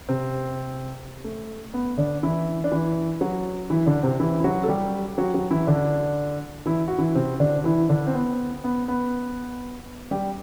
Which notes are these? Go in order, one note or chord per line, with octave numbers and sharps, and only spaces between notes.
C3 C4
A3
B3
D3 D4
E3 E4
D4
E3 E4
F#3 F#4
E3 E4
D3 D4
C3 C4
E3 E4
E4
F#3 F#4
A4
G3 G4
F#3 F#4
F#3 F#4
E3 E4
D3 D4
E3 E4
F#4
E3 E4
C3 C4
D3 D4
E3 E4
D3 D4
C4
B3
B3
B3
G3 G4